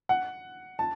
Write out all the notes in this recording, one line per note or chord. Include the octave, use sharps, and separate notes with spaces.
F#5
A5